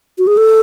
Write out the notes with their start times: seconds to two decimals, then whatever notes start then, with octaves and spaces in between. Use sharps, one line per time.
0.18 F#4
0.27 G#4
0.37 A4